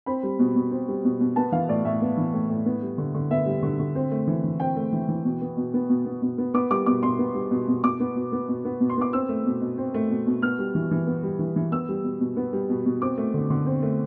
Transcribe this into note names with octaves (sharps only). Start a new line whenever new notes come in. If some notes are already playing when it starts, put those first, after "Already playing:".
C4 B5
G3
B2
B2
C4
G3
B2
B2
B3 A5
E3 F5
A2 D5
A2 E5
B3
E3
A2
A2
B3
G3
D3
D3
B3 E5
G3
D3
D3
C4
A3
E3
E3
C4 G5
A3
E3
E3
B2
B3
B2
B3
B2
B3
B2
B3
B3 D6
G3 D6
B2 D6
B2 C6
B3
G3
B2
B2
B2 D6
B3
B2
B3
B2
B3
B2
C6
B3 D6
C4 E6
A3
B2
B2
C4
A3
B2
B2
B3 F6
G3
E3
E3
B3
G3
E3
E3
B3 E6
G3
B2
B2
B3
G3
B2
B2
C4 D6
A3
D3
D3
C4
A3